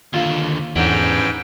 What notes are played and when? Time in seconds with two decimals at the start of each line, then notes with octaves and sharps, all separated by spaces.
0.14 D#2 D3 F4
0.76 E2 G#2 D3 E3 C#4 G5